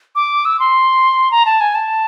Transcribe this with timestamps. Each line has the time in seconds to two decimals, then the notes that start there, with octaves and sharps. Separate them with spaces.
0.15 D6
0.45 E6
0.60 C6
1.31 A#5
1.46 A5
1.61 G#5
1.75 A5